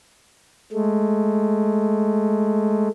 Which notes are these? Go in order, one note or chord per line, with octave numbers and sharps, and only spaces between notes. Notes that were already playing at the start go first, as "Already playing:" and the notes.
G#3 A3